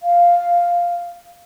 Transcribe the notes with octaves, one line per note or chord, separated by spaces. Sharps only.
F5